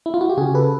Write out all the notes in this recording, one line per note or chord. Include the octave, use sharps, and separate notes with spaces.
E4
F4
F#4
G4
C#3 F#4 G#4
A4 B4